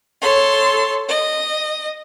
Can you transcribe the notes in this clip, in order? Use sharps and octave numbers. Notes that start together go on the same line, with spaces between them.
A4 C#5 C6
D#5